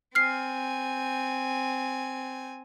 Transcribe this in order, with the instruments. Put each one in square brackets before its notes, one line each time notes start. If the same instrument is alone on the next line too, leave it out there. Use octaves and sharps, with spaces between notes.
[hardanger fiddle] C4 G#5 [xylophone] F6 C7